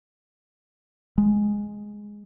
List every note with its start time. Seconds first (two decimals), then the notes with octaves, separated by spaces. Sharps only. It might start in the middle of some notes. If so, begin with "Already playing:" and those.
1.18 G#3